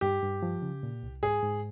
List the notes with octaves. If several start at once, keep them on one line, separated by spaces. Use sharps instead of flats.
G2 G4
G2
F3
C#3
A#2
C2
G#2 G#4
G#2